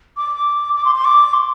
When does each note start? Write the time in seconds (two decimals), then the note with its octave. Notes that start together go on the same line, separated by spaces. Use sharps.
0.17 D6
0.76 D6
0.85 C6
0.96 C6
1.05 D6
1.33 C6